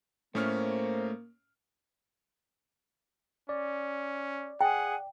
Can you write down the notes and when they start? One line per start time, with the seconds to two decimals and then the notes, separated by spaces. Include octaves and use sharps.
0.35 A2 A3 A#3 C#4 C5 F6
3.49 C#4 D5
4.61 G#4 F#5 G5